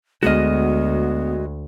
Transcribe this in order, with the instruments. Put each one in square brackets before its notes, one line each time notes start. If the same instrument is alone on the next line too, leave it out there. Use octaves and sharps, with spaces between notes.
[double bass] D2 [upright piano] G#3 F6 [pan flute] B3 [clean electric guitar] F#4 D#5